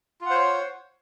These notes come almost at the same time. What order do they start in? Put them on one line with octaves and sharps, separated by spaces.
F4 F#5 C5 C#5